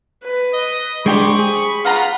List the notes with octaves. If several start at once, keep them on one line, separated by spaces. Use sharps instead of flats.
B4
D#5
G#3 D4 G4 C5 G5 B5 C#6 D6
G#4
F4 F5 F#5 A#5